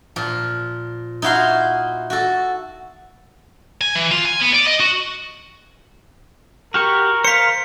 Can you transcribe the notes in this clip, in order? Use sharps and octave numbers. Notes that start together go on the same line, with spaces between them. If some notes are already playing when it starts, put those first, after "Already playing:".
A#2 F3
D#4 E4 F#4 F5 C6
F#4 A4
G#5
E3
F4
G#5
B3
D5
D#5
F#4
F#4 G4 A#4 C#6 F6
C5 F5 B6 C#7